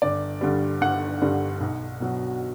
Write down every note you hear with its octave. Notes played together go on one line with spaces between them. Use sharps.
G1 D5
G2 D3 G3
G1 F#5
G2 D3 G3
B1
B2 F#3